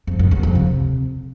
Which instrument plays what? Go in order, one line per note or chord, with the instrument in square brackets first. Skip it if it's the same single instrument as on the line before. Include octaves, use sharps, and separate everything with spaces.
[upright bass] F2
F#2
E2
F2
C3